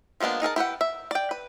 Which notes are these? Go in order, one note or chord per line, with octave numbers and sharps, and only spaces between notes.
F3 G#3 A#3 B3 D4
D#4 G#4 A#4 A5
E4 G4 B4 F#5
E5
D5 G5
B4